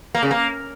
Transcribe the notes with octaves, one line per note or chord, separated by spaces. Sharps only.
A#3
C#3
A#3